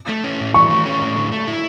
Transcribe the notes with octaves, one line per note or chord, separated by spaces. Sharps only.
A3
C#4
A2
E3 C#6
A3
C#4
A2
D3
A3
E4